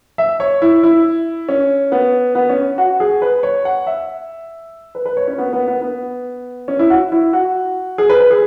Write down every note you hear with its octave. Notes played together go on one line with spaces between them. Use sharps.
E5
C#5
E4
E4
C#4
B3
B3
C#4
F#4
G#4
B4
C#5
F#5
E5
B4
B4
C#5
C#4
B3
B3
B3
B3
C#4
E4
F#4
E4
F#4
G#4
B4
B4
G#4